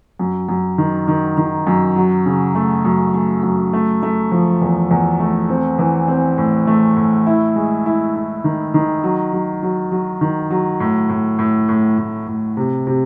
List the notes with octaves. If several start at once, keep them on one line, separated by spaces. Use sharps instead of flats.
F#2
F#2
D#3
D#3
D#3
F#2
F#3
C#3
A3
F#2
A3
F#2
A3
A3
F3
E2
E2
A3
C4
E3
C4
A2
A3
A2
E4
G#3
E4
E4
D#3
D#3
F#3
F#3
F#3
F#3
D#3
F#3
A2
A2
A2
A2
A2
A2
C3
C3